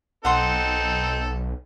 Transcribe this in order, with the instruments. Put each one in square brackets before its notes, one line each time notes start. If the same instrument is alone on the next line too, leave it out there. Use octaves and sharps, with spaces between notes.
[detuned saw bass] B1 [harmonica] C4 D#4 A4 [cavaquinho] F#5 C6